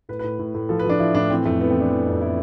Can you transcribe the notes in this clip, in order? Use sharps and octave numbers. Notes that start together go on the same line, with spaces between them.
A2 B4
B4
A2
A2
A2
F3 A4
B4
F3 D4
F3 E4
A2 D4
E3 C4
F2 A3
E3 B3
C4
E3 D4
E3
F2
E3 E4